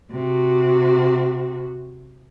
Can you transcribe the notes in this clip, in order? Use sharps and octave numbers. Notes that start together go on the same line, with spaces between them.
C3 F#4